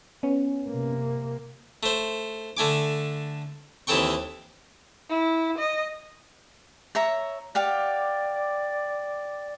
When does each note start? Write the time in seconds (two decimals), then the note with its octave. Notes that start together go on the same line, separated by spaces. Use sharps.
0.23 B3 C#4
0.68 C3 A#3
1.83 A3 C5
2.57 D3 A3 G#5 D6
3.87 D#2 E3 C4 A4 G5 C#6
5.09 E4
5.58 D#5
6.95 C#5 E5 A#5
7.55 G4 D5 F5 F#5